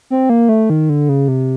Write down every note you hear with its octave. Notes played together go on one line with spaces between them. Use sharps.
C4
A#3
A3
D#3
D3
C#3
C3